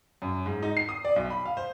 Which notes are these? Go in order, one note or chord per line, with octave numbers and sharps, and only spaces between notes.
F#2
G#2
D#4
C7
D#6
D5
B1
B5
F5
C5